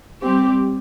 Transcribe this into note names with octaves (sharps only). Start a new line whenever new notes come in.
G3 C4 G4